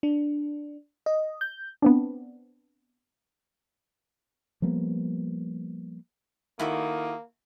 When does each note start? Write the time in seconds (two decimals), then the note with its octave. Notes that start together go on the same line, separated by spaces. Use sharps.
0.03 D4
1.06 D#5
1.41 G6
1.82 B3 C4 D4
4.62 F3 G3 A#3 B3
6.59 D#3 A#3 E4 F#4 A4